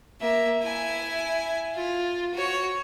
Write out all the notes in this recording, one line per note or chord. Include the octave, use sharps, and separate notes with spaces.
A#3 E5
E4 G#5
F4
F#4 C#5